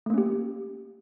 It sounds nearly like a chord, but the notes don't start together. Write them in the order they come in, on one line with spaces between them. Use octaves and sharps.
A3 A#3 C#4 G4